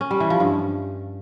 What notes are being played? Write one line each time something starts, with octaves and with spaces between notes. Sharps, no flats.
C#4
G3
E3
F3
G2